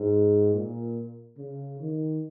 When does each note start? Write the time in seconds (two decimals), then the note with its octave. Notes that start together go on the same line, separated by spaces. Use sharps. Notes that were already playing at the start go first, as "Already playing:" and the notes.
Already playing: G#2
0.54 A#2
1.38 C#3
1.80 D#3